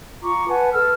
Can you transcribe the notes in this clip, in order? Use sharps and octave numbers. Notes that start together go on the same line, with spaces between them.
F4 A#5 C#6 D6
B4 F#5 G#5 A5
A4 B4 E6 F6